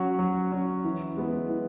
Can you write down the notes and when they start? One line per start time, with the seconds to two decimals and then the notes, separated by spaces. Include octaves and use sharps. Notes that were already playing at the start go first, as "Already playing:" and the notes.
Already playing: F#3 C#4 F#4
0.19 F#3
0.52 C#4 F#4
0.84 E3
1.17 G#3 B3 E4
1.49 E3